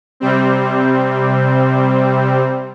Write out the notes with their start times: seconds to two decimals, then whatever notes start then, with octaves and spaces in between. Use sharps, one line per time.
0.20 C3 G3 C4